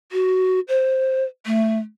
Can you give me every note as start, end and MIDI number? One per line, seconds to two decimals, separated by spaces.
0.12 0.60 66
0.68 1.24 72
1.46 1.79 57